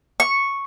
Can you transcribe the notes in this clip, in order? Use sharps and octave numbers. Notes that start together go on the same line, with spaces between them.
C#6